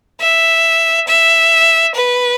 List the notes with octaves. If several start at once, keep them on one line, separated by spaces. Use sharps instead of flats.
E5
E5
B4